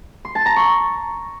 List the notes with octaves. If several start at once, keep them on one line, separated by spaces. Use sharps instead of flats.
C6
A5
A#5
C#6